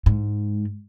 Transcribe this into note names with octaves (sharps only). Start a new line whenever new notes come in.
G#2